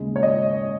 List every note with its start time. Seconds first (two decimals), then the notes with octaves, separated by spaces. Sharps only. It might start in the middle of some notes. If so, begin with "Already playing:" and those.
Already playing: D#2 C#3 G#3
0.16 C#5
0.23 D#5